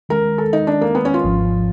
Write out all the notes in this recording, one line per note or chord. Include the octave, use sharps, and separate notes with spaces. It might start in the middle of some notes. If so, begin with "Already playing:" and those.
D#3 G#3 C#4 A#4
A4
D#4
D4
A#3
B3
C#4
F4
G#1 G#2 F3